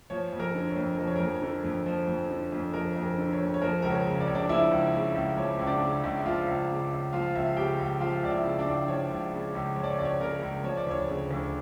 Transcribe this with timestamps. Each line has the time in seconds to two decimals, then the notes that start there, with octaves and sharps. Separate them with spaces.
0.10 F3 C#5
0.33 F2
0.40 A#4
0.55 D3
0.69 C#5
0.76 F2
0.98 F3 A#4
1.07 C#5
1.16 F2 A#4
1.42 D3
1.64 F2
1.86 F3
2.08 F2
2.30 D3
2.52 F2
2.74 F3 A#4
2.96 F2
3.03 A#4
3.18 D3
3.33 C#5
3.40 F2
3.54 C#5
3.61 F3 A#4
3.82 C#2 A#4
3.90 C#5
4.05 C#3
4.20 D5
4.27 C#2 C#5
4.35 D4 D5
4.49 F3 E4 E5
4.71 C#2
4.93 C#3
5.15 C#2
5.37 F3 C#5
5.59 C#2
5.67 D4 D5
5.82 C#3
6.04 C#2
6.19 E5
6.25 F3 F4 F5
6.48 C#2
6.69 C#3
6.91 C#2
7.12 F3 F4 F5
7.35 C#2 E5
7.46 F5
7.57 C#3 G4 G5
7.79 C#2
8.00 F3 F4 F5
8.23 C#2 D5
8.30 E4 E5
8.44 C#3
8.59 D4 D5
8.67 C#2
8.88 F3 C#5
9.10 C#2
9.33 C#3
9.55 C#2
9.76 F3 C#5
9.84 D5
9.90 C#5
9.99 C#2 D5
10.05 C#5
10.20 C#3 A#4
10.42 C#2
10.64 F3 C#5
10.77 D5
10.87 D2 C#5
11.08 C#3
11.31 D2